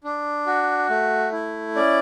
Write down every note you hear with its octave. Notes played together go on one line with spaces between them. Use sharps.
D4
F#4
A3
E4
C#4 D5